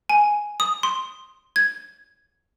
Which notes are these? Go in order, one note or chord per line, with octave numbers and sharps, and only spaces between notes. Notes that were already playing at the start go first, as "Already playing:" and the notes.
G#5
D#6
C6
G#6